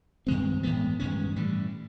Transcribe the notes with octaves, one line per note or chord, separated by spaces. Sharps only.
G2 D#3 G#3 C4
A2 E3 G#3 B3
G2 D#3 G#3 C#4
A2 E3 G3